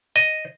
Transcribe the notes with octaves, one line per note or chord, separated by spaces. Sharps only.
D#5